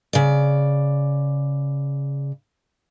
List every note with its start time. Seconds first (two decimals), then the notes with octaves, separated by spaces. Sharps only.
0.13 C#3 D5